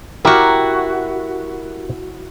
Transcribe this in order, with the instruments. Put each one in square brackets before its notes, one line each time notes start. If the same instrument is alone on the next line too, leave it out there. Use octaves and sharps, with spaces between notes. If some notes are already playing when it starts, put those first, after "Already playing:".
[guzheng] E4 F#4 [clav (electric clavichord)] G4 A#4